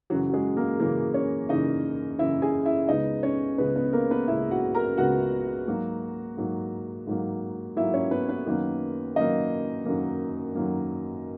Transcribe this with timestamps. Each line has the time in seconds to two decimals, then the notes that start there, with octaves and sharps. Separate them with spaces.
0.10 F#2 C#3 E3 F#3 F#4
0.29 F#4
0.34 G#3 G#4
0.57 A#3 A#4
0.79 F#2 C#3 E3 A#3 A#4
1.14 C#4 C#5
1.49 F#2 C#3 E3 D#4 D#5
2.18 F#2 C#3 E3 E4 E5
2.42 G#4 G#5
2.66 E4 E5
2.89 C#2 C#3 G#3 B3 D#4 D#5
3.23 C#4 C#5
3.58 C#2 C#3 G#3 B3 B4
3.76 B3 B4
3.93 A#3 A#4
4.11 B3 B4
4.28 C#2 C#3 G#3 B3 E4 E5
4.51 F#4 F#5
4.75 A#4 A#5
4.97 C#2 C#3 G#3 B3 F#4 F#5
5.68 G#2 F#3 A#3
6.37 G#2 F#3 A#3
7.07 G#2 F#3 A#3
7.76 G#2 F#3 A#3 E4 E5
7.93 C#4 C#5
8.11 B3 B4
8.29 B3 B4
8.46 F#2 D#3 F#3 A#3
9.16 F#2 D#3 F#3 A#3 D#4 D#5
9.85 F#2 D#3 F#3 A#3
10.55 F#2 D#3 F#3 A#3